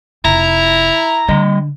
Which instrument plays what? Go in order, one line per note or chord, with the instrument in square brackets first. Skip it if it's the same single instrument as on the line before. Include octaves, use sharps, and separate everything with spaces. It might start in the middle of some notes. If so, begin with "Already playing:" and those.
[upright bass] F1 [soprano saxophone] E4 [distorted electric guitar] A#5
[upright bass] D3 [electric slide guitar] G3 D#5